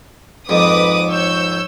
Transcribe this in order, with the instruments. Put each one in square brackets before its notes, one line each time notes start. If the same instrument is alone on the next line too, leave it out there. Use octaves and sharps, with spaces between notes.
[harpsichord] F2 G#2 [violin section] B4 D6 D#6
[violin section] C#5 E6 G6